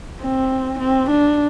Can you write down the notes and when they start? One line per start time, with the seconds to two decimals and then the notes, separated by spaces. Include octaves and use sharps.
0.21 C4
0.80 C4
1.10 D4